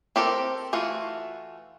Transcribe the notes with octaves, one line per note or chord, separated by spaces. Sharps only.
C4 G4 A4 A#4
E3 A3 F4 F#4